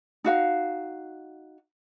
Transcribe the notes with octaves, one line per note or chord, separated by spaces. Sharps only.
D#4 F#4 F5